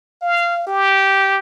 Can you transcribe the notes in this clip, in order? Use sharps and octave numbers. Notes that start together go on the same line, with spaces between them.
F5
G4